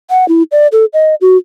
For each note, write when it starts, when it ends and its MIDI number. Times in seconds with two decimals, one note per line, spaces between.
0.10 0.27 78
0.28 0.43 64
0.52 0.67 74
0.72 0.85 69
0.93 1.15 75
1.21 1.37 66